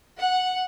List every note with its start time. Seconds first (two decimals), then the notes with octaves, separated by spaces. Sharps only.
0.17 F#5